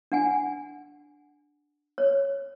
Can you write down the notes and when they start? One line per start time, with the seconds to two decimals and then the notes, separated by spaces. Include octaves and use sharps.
0.12 D4 F#5 G#5
1.98 C#5